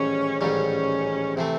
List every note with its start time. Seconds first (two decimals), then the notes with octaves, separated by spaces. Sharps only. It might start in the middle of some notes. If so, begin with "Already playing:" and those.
Already playing: A1 G#2 D#3 G3 C#4
0.41 A1 G#2 D#3 G3 C#4
1.36 C3 E3 A3 C4